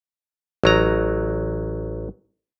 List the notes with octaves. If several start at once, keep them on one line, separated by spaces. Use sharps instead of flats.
A1 F#3 A#5